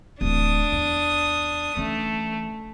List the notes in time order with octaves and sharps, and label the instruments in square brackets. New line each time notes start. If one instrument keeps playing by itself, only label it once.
[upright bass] D1 E3 [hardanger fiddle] D4 D#6
[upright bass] E2
[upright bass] E3 C#4 [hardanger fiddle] A3